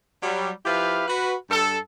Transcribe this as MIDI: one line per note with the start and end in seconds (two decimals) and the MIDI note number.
0.23 0.51 54
0.23 0.51 55
0.65 1.04 53
0.65 1.04 64
0.65 1.04 67
0.65 1.04 71
0.65 1.04 77
1.08 1.35 66
1.08 1.35 71
1.50 1.78 43
1.50 1.78 69